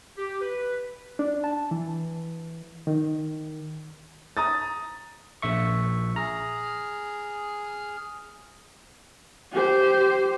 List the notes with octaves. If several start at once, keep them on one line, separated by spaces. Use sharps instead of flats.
G4
B4
D4
A5
E3
D#3
A#5 D#6 A6
A#1 E5 C#6
G#4 A#5 F6
G4 C5